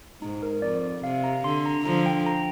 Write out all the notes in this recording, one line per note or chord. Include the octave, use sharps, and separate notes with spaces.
G#2 D#4
A#4
F2 D5
C3 F5
A#5
D3 C6
A#5
D3 F3 A#5
G5
A#5